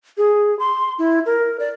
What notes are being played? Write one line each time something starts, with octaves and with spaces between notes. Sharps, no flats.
G#4
C6
E4
A#4
D5